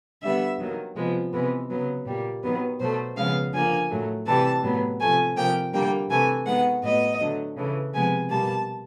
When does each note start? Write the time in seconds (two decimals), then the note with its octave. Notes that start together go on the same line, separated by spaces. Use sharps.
0.22 D3 G3 B3 E5
0.59 D#3 F#3 A#3
0.95 C3 F3 G#3 B3
1.32 C3 E3 G#3 B3
1.70 C#3 F#3 B3
2.05 A#2 G3 A#3
2.43 D#3 F#3 B3
2.79 B2 F#3 A3 C5
3.16 C#3 F3 G#3 B3 F5
3.53 D3 F3 A#3 G#5
3.90 A2 F#3 A3
4.26 C3 E3 G3 A5
4.63 A2 F#3 B3
5.00 C3 F3 A3 G#5
5.36 C3 F3 A#3 G5
5.73 D3 G3 A#3 G5
6.09 C3 E3 A3 G#5
6.46 D#3 G#3 B3 F#5
6.82 A2 F#3 B3 D#5
7.20 D3 F#3 A3
7.56 C#3 E3 A3
7.93 C3 F3 G#3 B3 G#5
8.29 B2 G3 A#3 A5